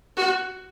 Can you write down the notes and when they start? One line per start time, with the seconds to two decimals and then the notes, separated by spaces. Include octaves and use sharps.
0.17 F#4